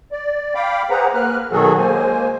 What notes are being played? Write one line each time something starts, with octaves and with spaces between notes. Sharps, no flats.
D5
F5 G5 B5 D6
G#4 B4 C5 F#5 A#5
A#3 B4 F6 F#6
B2 D#3 F#3 F#4 G#4 A4
G#3 A#3 C5 G#5